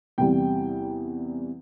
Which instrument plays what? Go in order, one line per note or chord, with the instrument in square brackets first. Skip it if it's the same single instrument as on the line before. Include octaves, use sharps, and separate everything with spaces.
[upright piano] E2 C3 E3 G3 G5